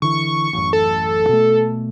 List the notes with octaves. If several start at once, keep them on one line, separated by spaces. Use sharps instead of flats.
D3 E3 C#6
A1 F#2
A4
B2 A3